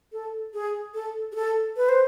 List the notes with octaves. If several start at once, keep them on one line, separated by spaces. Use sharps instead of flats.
A4
G#4
A4
G#4
A4
B4
C5